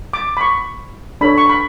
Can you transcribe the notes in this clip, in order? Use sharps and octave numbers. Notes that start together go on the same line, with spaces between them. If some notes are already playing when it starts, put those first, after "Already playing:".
D6
B5
C#6
D4 A4 C#5 B5
C#6
B5